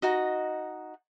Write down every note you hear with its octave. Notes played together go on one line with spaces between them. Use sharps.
D#4 F#4 D#5